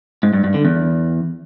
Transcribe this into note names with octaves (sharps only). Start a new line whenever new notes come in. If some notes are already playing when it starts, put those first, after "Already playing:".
G#2
G2
G2
D3
E2